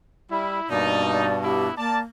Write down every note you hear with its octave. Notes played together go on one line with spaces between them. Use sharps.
G3 E4
G2 B2 A#3 D#4 D5
D5
B3 E4 G4
A#3 D5 A5